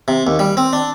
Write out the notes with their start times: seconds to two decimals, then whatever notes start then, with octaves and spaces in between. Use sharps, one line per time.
0.08 C3
0.27 D#2
0.39 G3
0.57 C4
0.73 D4